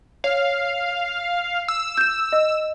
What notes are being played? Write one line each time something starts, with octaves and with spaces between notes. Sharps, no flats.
C#5 F5
E6
G6 E7
D#5